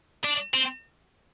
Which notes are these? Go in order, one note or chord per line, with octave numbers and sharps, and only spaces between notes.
D4
C4